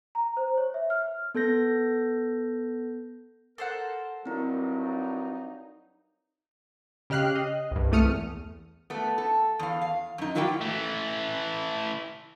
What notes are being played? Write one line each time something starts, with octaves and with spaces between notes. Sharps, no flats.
A#5
C5
C#5
E5
F6
B3 A4 G6 A#6
A4 A#4 C5 F#5
G2 F#3 C4 D#4 E4 A#4
C#3 G4 D#5 F6 F#6 C7
D#5
C2 G2
C2 E3 A3 D#6 F6 C#7
E2
A3 B3
A4
E2 F5
F5
F#2 D#4
F3 F#3 A#3 E4 F#4 G4
E3 A3